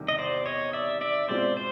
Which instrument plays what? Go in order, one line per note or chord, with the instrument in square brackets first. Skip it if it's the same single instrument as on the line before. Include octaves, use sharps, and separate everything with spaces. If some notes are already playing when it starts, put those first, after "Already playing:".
Already playing: [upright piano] E2 C3 D#3 G3
[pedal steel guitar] D#5
C5 D5
C#5 D#5
D5 E5
D5 E5
[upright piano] B2 G#3 C4 F4 [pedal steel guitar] C5 D5
[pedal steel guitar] C5